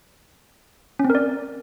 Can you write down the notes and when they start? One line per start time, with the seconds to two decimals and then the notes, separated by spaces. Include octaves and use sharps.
0.99 C#4
1.05 C4
1.10 A#4
1.15 D5